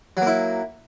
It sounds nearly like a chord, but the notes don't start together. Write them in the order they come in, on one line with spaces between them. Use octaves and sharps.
F#3 A#3 E4